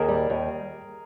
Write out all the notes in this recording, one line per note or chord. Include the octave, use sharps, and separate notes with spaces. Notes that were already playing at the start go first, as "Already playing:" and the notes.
Already playing: D#2 G#4 A#4
G3
D#2